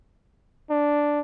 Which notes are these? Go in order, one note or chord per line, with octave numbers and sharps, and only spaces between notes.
D4